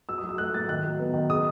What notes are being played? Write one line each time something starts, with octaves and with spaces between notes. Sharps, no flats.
F#3 E6
D#6
F#3
E6
A3 F#6
A2 A6
D#3 F#6
F#3
B3
D#3
C#3 D#6